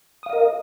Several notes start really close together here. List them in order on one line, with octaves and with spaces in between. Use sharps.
D#6 F5 D#5 A#4